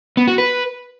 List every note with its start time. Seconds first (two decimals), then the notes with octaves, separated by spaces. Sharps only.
0.17 B3
0.28 F#4
0.38 B4